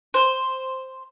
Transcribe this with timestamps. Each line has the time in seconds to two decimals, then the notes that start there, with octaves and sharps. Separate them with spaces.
0.14 C5